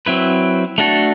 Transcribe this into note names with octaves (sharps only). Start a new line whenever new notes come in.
F#3 C4 E4 B4
A3 D4 F#4 A4